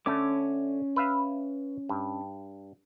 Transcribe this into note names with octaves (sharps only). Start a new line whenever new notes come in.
D3 A3 C#4 C#5 D6
B4 E5 F5
G2